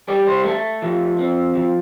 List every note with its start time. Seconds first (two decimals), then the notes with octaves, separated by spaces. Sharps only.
0.08 G3 D5
0.27 C5
0.44 A3 A4
0.82 F3
1.19 C4
1.55 F3